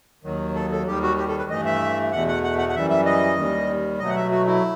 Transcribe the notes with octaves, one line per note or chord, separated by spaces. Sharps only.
D#2 D#3 F#3
A4
A4
D#2 D#3 G3 G4
F#4
G4
A4
B4
G2 E3 A3 D#5
E5
E2 B2 A3 F#5
F#5
F#5
F#5
F#5
F#2 E3 G3 E5
E5
D#5
D#2 D#3 G3
B2 F#3 A3 D#5
F#5
E5
F#4
E4